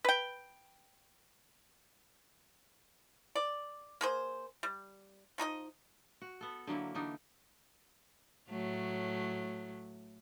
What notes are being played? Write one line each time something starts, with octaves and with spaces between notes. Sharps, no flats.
B4 G5
D5
A#3 G#4 C5
G3
F3 D#4 G4 D#5
F#4
B3 A4
D3 F#3 A#3 E4
D3 E3 D4 D#4
A2 F#3 A3